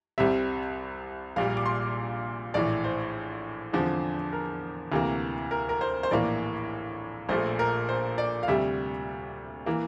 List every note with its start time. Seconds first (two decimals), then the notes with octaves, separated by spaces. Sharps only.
0.18 C2 C3 G3 C4 E5
1.36 A#1 A#2 G3 F5
1.57 D6
1.66 C6
2.54 A#1 A2 E3 D5
2.84 C5
3.73 E2 D3 F3 C4
4.33 A#4
4.92 D2 C3 E3 A#3
5.51 A#4
5.69 A#4
5.81 C5
6.03 C5
6.11 A#1 A2 E3 A#3 D5
7.29 A#1 A#2 A3 C5
7.59 A#4
7.89 C5
8.18 D5
8.43 F5
8.48 D2 C3 G3 E5
9.66 E3 A#3